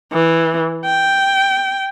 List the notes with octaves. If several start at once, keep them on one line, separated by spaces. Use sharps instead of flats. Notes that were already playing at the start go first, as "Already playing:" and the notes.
E3
G5